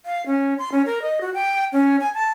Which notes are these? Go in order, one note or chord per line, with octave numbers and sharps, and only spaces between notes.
F5
C#4
C6
C#4
A#4
D#5
F#4
G5
C#4
G#5
A5